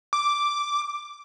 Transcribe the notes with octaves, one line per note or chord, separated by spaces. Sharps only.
D6